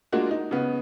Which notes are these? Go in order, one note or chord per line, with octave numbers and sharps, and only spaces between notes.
G#3 A#3 D4 F4 F#4
D#4
C#3 B3